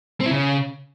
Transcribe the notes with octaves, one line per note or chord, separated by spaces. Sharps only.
C4
E4
C#3